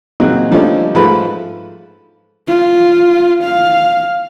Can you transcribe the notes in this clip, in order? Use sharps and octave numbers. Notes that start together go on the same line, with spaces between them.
A#2 C#3 F#3 C4 D#4 F#4
D3 F3 G3 A3 C#4 D#4
G#2 F3 G#3 A3 B4 B5
F4
F5